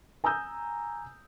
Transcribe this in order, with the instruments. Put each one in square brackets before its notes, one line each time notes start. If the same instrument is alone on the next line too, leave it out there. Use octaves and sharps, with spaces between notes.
[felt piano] G#5 A#5 D#6 E6 G6